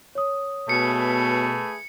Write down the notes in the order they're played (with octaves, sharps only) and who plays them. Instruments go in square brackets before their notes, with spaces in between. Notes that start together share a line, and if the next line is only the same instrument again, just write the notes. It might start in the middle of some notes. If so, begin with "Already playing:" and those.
[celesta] C#5 D#6
[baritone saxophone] B2 [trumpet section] A3 G#4 B4 [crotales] C#7